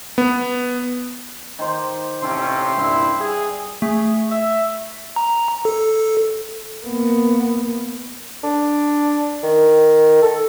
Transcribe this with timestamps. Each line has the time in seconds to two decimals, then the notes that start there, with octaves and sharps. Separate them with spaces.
0.18 B3
1.59 D#3 C5 D6
2.22 A1 C3 C#4 A4 E5 G5 C6
2.77 C2 G2 A#2 E4
3.20 G#4
3.82 A3 G#4
4.30 E5
5.16 A#5
5.65 A4
6.84 A#3 B3
8.44 D4
9.43 D#3
10.22 A4